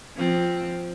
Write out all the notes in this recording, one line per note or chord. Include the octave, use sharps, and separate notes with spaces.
F3 C4